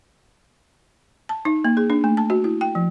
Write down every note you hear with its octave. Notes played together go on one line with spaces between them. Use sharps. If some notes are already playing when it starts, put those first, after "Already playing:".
A5
D#4
A#3
G#4
D4
A3
A5
F#4
E4
G5
F3